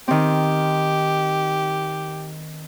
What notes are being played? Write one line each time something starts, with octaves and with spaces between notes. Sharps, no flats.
D#3 C4 G4